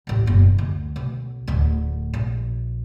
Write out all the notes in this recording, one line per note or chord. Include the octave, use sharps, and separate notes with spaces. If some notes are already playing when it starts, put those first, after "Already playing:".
D1 A1
F#1 B2
D2
B1
D1 D2
A#1